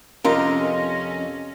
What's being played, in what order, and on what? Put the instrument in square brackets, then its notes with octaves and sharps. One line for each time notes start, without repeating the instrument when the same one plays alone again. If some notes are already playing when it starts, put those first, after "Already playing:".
[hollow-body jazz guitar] F2 A#4 [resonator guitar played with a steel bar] C3 F4 [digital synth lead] C#4 [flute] D#5